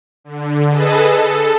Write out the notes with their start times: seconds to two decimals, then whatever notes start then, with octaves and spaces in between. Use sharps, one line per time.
0.24 D3
0.70 G#4 A4 B4 D#5 A5
1.05 A4